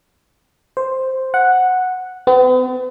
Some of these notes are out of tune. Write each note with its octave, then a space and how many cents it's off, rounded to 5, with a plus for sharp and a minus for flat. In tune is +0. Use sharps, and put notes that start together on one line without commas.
C5 +0
F#5 -5
B3 +45